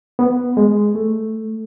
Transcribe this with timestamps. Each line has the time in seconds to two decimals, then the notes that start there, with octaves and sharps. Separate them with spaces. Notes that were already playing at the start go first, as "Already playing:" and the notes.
0.19 B3
0.57 G#3
0.95 A3